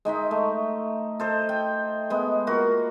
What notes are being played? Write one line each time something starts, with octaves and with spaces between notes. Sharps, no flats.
G#3 D#4 D#5 E5
A3
A4 C5 D#5
G5
G#3 B3
A#3 F4 F#4